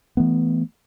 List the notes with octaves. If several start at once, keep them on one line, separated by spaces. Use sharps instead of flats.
E3 A3 B3